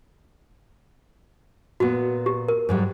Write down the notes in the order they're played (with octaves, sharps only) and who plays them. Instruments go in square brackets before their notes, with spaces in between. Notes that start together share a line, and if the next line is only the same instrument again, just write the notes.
[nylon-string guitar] A#2 B3 [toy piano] F#4
[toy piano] G4
A#4
[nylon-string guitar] G#2 F#3 G3